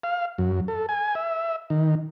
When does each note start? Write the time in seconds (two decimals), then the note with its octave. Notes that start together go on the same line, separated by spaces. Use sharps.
0.03 F5
0.38 F#2
0.68 A4
0.89 G#5
1.15 E5
1.70 D#3